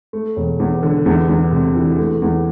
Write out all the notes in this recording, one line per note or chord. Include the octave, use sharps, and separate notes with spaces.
A3
E1
E2
D3
E2
E2
C3
E3
A3
E2